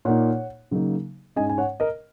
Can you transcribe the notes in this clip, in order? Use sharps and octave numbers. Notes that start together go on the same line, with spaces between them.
A#2 A#3 D#4 C#5 F#5
C#3 F#3 A#3 D#4
G#2 G#3 C#4 D#5 G#5
G#5
C#5 F#5
A#4 D#5